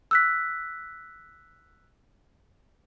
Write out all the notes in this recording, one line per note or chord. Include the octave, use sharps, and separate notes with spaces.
E6 F#6 B6